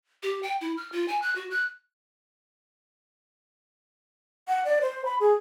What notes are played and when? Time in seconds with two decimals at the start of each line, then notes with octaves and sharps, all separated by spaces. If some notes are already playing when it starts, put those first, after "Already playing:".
0.23 G4
0.43 G5
0.61 E4
0.77 F6
0.92 F4
1.08 G#5
1.22 F#6
1.35 F#4
1.51 F#6
4.48 F#5
4.65 D5
4.81 C5
5.05 B5
5.20 G#4